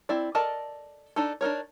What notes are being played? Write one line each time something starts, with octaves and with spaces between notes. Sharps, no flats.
C4 E4 D5
A4 A#4 D5 D#5 A5
D4 D#4 A4
D4 D#4 A#4 C#5